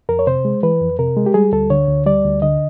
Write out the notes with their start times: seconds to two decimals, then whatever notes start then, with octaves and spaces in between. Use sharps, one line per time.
0.09 F2 A#4
0.19 C#5
0.27 C3 C5
0.45 G#3
0.63 E3 B4
0.81 F2
0.99 C3 A#4
1.17 G#3
1.26 G4
1.34 G3 G#4
1.52 D2 A4
1.70 D3 C#5
1.88 D2
2.06 G3 D5
2.25 D2
2.42 D3 D#5